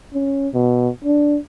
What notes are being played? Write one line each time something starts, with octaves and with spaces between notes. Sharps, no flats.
C#4
B2
D4